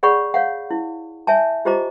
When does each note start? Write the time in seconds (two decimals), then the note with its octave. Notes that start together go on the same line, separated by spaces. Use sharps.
0.03 G#4 C#5 D5 F#5 B5 C#6
0.34 C#5 F5 F#5
0.71 E4
1.27 C#5 E5 G#5 A5
1.65 F4 G4 C5 D#5 A#5 D6